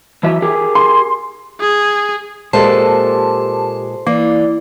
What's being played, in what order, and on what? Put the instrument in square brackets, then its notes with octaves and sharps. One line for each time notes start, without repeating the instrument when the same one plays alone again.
[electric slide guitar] E3 F#3 E5
G4 G#4 A#4
[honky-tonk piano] C6
[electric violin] G#4
[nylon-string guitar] A#2 G#3 A#3 [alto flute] G4 [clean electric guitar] A4 C5 [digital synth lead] A5
[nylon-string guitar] E3 [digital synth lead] A#3 [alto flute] D5